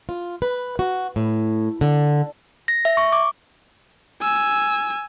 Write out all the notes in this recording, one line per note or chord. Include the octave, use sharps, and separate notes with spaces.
F4
B4
F#4
A2
D3
A#6
E5
C#6
D6
G#5 E6